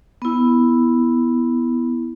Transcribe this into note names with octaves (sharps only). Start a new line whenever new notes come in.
B3 E4